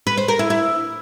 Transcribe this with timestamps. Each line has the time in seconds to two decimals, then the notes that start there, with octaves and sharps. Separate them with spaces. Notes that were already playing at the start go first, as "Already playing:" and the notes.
0.07 B4
0.17 C5
0.28 A#4
0.39 E4
0.50 E4